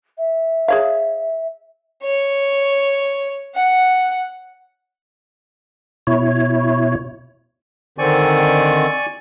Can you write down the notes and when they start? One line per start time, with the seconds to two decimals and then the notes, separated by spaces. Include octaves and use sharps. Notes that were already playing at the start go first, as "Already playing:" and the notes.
0.18 E5
0.68 G#4 C#5 F5
2.03 C#5
3.55 F#5
6.07 B2 E4 C#5
7.98 D3 D#3 C4 D5 G#5 C#6